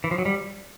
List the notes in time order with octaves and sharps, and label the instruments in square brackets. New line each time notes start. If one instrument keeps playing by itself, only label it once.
[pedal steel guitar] E3
F3
F#3
G3